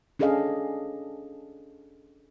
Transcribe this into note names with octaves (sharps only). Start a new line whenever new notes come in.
C#4 D4 G#4 A4 D#5 F5